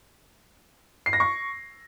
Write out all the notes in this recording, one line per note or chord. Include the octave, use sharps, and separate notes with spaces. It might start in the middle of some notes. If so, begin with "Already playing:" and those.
C7
A#6
C#6